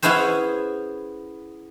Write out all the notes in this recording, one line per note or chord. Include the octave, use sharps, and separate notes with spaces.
B3 C#4 E4 G#4 B4 C5